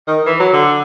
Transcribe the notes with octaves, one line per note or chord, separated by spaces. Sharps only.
D#3
E3
F#3
D3